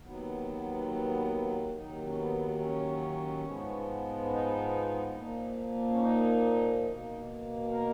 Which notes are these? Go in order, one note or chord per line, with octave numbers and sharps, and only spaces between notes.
D#2 D#3 F#3 B3
B3
D#2 D#3 F#3 D#4
C#4
B3
C#4
G#2 F3 G#3 B3
C#4
D#4
A#2 F3 A#3
C#4
D#4
B2 A#3
A#4